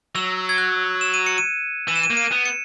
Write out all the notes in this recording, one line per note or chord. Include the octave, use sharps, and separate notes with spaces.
F#3 E6
G#6
F#6
E7
D#7
C#7
D#7
E3 D#7
E7
D#7
A#3
D#7
B3
C#7